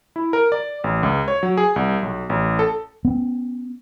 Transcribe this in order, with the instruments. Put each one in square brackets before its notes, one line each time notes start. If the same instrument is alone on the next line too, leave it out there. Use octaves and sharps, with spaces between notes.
[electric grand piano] E4
A#4
D5
A1
C#2
C#5
F#3
G#4
C2
B1
A1
A4
[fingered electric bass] B3 C#4